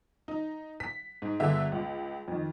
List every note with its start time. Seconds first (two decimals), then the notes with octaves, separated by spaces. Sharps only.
0.28 D#4
0.80 B6
1.22 G#2
1.40 G1 D3 G#4 E5
1.72 C#2
2.28 F2 D#3